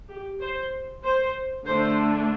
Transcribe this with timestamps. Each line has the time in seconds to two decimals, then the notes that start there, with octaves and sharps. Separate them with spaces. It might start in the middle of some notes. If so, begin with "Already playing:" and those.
0.09 G4
0.40 C5
1.04 C5
1.66 D3 A3 D4 C5